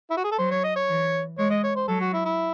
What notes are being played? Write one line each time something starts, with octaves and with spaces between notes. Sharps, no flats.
E4
F#4
G#4
A4
F#3 C5
C#5
D#5
C#5
E3
G#3 C#5
D#5
C#5
C5
F#3 A4
F#4
E4
E4